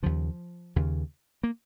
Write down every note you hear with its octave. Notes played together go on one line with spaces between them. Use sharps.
D#2 C#3 F3
D#2 C#3
A#3